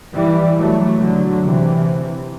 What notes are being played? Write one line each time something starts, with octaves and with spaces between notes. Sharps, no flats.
E3 G3
F#3 A3
D3 F#3
C3 E3